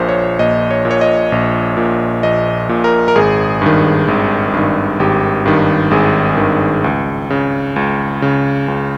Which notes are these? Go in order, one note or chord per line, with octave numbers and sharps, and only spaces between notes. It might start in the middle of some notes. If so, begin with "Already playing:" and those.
Already playing: A#1 A#2 C5
C#5
A#1 D#5
C#5
A#2
C#5
D#5
A#1
A#2
A#1 D#5
A#2
A#4
A#4
G#1 G#4
G2 D#3
G#1
G2 D#3
G#1 G4
G2 D#3
G#1 G#4
G2 D#3
C#2
C#3
C#2
C#3
C#2